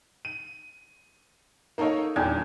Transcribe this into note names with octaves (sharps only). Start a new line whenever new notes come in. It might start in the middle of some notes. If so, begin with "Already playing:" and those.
D#7
A#3 D#4 A4 C#5 D#5
D#1 E2 D4 G5 G#6